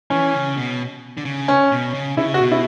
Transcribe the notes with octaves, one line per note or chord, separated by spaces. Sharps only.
E3 C#4
C#3
B2
D3
C#3
C#4
B2
C#3
C#3 E4
F#4
B2
E4